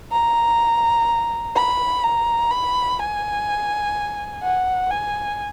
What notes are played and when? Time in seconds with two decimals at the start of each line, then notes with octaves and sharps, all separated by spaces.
0.12 A#5
1.56 B5
2.03 A#5
2.51 B5
3.00 G#5
4.43 F#5
4.91 G#5